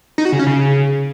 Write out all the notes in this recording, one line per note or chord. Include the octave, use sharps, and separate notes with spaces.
D#4
F#4
C#3
C#4
C#3